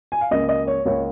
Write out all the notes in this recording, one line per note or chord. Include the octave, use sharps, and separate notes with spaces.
G#5
F5
C#2 C#3 A#3 D#5
D#5
C#5
C#2 C#3 A#3 C#5